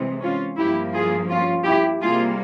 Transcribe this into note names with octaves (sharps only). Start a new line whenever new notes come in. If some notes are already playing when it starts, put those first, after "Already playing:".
Already playing: C3 E3 G#3
C#4 F4
G2 F3 A#3 E4 G4
F4 G#4
C#4 F4
E4 G4
C3 G3 A#3 F4 G#4